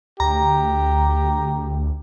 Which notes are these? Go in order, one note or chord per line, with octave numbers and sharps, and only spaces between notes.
D2 G4 A#5